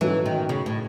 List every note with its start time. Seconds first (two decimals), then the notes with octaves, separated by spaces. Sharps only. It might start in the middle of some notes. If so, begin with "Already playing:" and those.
0.01 G#2 E3 F#3 A3 C#4 F#4
0.26 D#3
0.49 C#3
0.66 A2